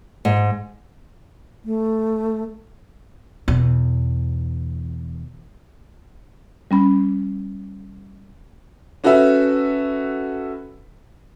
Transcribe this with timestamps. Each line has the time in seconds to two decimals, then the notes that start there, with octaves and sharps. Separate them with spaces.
0.25 G#2
1.65 A3
3.48 E2 B2
6.71 G3 C#4 B5
9.04 C#4 F#4 A4 B4 E5